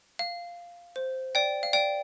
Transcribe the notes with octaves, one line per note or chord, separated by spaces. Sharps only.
F5
C5
D5 G5
F5
D5 G5